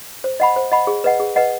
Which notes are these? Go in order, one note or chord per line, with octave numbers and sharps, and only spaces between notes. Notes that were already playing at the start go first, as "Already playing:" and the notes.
C5
D#5 F#5 B5
C5
D#5 F#5 B5
G#4
B4 D#5 F#5
G#4
B4 D#5 F#5